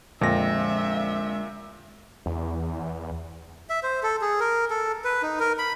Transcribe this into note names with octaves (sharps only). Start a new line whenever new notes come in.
F2 A#2 D3 G#3 E5 A#6
E2
E5
C5
A4
G#4
A#4
A4
B4
D#4
A#4
B5